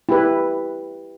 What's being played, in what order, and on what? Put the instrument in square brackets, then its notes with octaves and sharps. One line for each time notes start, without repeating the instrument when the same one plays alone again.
[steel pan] E4 G4 B4